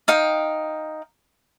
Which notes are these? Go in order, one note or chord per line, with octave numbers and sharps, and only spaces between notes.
D#4 F5 G5